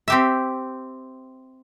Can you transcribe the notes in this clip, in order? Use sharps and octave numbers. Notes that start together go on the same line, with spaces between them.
C4 G4 E5